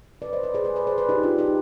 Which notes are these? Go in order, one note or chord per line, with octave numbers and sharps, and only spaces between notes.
B4 D5
C5 D#5
B4 D5
G#4 C5
B4 D5
B4 D5
G#4 C5
B4 D5
D#4 G4
D4 F4
D#4 G4